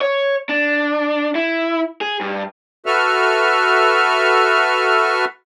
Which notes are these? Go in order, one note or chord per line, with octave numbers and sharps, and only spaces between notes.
C#5
D4
E4
G#4
G2
F#4 A4 B4 E5 F6